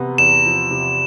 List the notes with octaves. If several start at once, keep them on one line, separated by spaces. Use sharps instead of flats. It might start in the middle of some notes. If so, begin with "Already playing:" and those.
Already playing: C3 B3
E2 E7
F3
C3